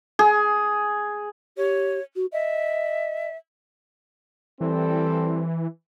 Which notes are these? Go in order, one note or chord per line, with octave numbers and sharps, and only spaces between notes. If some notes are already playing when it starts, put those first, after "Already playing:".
G#4
G4 C#5
F#4
D#5 E5
E3 G3 C4 A4